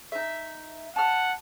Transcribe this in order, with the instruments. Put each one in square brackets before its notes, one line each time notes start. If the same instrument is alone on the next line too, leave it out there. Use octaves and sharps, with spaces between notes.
[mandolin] D#4 E5
[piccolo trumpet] F#5 [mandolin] A5 F6